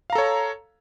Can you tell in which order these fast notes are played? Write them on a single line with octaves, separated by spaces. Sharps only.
F5 A#5 A4 C#5